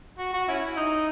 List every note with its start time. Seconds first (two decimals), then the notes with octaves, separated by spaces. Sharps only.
0.18 F#4
0.33 F#4
0.48 C#4 E4
0.76 D#4